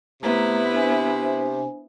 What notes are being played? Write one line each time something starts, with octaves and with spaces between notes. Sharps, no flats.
C3 A3 B3 E4 B4 A#5
D4 C5 G#5